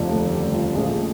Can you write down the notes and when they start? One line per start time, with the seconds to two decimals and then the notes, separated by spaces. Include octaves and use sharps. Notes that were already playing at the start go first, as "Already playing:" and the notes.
Already playing: F1 D#2 D3 F3
0.10 A3 A4
0.31 G3 G4
0.54 F4
0.74 A#1 A#2 F3 G#3 A3 G#4